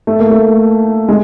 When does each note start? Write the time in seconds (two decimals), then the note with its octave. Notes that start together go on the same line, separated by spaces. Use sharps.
0.07 A3
0.19 A#3
0.31 A3
1.09 G#3